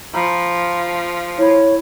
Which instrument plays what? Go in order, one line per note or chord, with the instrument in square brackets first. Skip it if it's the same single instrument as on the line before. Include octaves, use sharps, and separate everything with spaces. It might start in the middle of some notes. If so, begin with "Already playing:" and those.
[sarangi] F3 [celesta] A#5 B5
[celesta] E4 B5 [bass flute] C#5